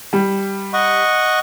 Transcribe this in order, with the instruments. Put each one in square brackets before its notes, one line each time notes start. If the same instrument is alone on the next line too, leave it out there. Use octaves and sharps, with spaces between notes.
[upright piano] G3
[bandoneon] D#5 F#5 C#6